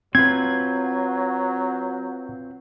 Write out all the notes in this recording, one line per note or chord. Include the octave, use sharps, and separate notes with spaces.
F#3 C4 F4 B4 G#6